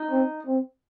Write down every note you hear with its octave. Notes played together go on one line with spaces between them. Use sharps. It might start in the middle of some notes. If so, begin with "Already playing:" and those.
Already playing: D#4
C4
C4